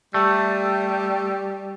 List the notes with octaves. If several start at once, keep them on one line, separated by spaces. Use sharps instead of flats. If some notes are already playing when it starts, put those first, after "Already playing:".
G3 A3